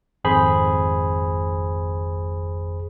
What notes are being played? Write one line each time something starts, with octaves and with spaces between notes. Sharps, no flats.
G#1 F2 G#4 C5 B5